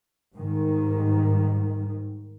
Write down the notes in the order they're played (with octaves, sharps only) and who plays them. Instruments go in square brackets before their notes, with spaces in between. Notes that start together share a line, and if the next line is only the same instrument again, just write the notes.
[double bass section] G#2 D#3 G3